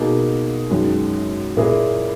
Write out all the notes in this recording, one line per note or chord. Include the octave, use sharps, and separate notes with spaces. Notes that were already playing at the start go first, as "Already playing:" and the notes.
Already playing: B2 A#3 D#4 G#4
F#2 D#3 G#3
A#2 A#3 E4 G#4